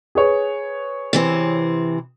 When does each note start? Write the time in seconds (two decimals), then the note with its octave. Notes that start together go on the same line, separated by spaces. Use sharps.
0.15 G#4 B4 C#5
1.13 C3 E3 C4